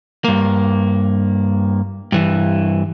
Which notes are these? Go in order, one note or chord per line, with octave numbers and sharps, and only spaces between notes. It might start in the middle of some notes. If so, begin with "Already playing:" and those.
G2 A#3
G2 E3